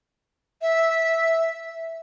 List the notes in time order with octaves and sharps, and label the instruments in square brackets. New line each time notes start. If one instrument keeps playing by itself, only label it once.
[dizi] E5